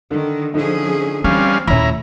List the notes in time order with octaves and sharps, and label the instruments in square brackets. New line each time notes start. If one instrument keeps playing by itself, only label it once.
[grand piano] D3 [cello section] D#3
[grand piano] D3 D#4 [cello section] F3 C#4 G#4
[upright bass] E3 [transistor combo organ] G3 C#4 F5 [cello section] C4
[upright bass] D#2 A#2 [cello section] A3 [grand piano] C#4 E5 B5 [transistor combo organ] E4 A#5